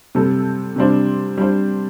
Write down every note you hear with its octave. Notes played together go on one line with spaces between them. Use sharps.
C3 G3 C4 A4
C3 G3 D4 C5
G3 D4 C5